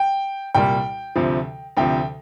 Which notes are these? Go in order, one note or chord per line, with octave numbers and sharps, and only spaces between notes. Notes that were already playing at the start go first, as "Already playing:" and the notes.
Already playing: G5
C2 A#2 G3 G5
D2 C3 F3
D2 C3 F3 G5